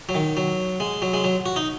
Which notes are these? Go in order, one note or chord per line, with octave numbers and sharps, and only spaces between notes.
F#3
D#3
F#3
G#3
F#3
G#3
F#3
F#4
D#4